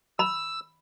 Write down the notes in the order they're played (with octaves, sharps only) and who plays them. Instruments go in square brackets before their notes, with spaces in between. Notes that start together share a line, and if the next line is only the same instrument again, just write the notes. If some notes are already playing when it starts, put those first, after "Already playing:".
[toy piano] B5 [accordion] E6